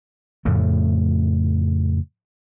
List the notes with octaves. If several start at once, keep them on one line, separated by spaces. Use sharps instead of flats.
F2 A2 C#3 A3